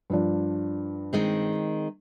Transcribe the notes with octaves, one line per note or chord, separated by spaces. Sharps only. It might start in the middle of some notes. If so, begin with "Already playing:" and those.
G2 F3 D4
D#3 G#3 C4